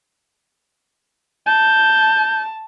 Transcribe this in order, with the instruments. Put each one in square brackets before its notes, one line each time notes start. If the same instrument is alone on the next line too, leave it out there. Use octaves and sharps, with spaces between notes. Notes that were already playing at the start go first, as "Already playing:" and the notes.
[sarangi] A5 [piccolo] G6